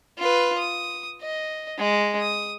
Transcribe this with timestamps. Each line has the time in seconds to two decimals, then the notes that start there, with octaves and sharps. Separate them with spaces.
0.18 F4 B4
0.58 D#6
1.21 D#5
1.78 G#3
2.20 D#6